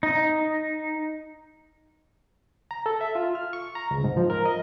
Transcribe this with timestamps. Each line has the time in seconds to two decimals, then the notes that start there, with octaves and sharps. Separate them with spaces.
0.03 D#4
2.71 A#5
2.86 A4
3.01 E5
3.15 F4
3.35 F6
3.53 C#6
3.75 A#5
3.91 C#2
4.04 G#2
4.17 F3
4.30 A#4
4.46 D#5